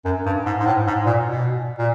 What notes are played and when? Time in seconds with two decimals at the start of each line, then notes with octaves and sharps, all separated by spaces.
0.05 F#2
0.26 G2
0.46 G#2
0.59 G#2
0.66 A2
0.87 G#2
1.06 A#2
1.27 B2
1.78 A#2